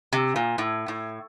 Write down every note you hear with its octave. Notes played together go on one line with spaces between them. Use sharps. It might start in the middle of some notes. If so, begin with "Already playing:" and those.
C3
A#2
A2
A2